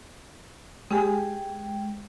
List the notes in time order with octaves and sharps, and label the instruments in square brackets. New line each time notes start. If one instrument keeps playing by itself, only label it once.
[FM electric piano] G#3 G5 [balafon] G4 G#4 G#5